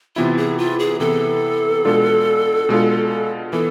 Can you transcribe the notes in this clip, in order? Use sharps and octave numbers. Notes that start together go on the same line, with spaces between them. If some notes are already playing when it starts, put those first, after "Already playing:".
C3 E3 B3 E4 F4
G#4
F4
G#4
C3 E3 B3 E4 A4
B2 G#3 D4 F4
B2 G#3 D4 F4
E3 B3 A4